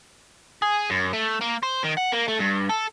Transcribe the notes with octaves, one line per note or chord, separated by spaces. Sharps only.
G#4
F#2
A3
A#3
C5
D#3
F#5
A#3
A3
G2
A4